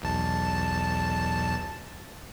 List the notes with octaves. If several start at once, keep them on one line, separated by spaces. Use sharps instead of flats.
B1 E2 A5